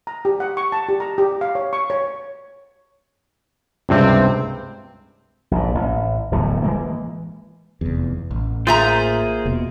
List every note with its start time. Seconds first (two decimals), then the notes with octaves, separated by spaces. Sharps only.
0.07 A#5
0.25 G4
0.40 F#5
0.57 C#6
0.72 A5
0.89 G4
1.00 A#5
1.18 G4
1.41 F5
1.55 C#5
1.73 C#6
1.90 C#5
3.89 C#2 G2 C3 C4
5.51 A#1 G#2
5.75 A1
6.32 D1 B1 E2 A2
6.62 E3 G#3 A#3
7.81 F1 E2
8.31 A1
8.67 A#3 F4 G#4 C5 E5 A#5
9.45 E1 B2